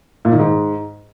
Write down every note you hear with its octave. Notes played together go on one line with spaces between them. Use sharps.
A#2
D#3
G#2